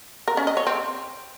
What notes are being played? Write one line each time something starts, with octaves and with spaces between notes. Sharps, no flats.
A#4
C#4
D#5
C#5
C4